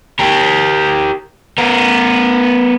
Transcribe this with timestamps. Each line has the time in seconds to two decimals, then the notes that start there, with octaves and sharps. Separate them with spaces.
0.19 G4 A#4
1.58 B3 A#4